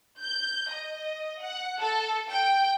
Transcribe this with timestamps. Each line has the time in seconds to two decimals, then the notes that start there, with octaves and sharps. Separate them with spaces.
0.20 G6
0.72 D#5
1.40 F#5
1.79 A4
2.30 G5